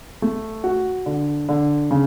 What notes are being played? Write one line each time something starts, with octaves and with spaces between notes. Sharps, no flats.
A3
F#4
D3
D3
C#3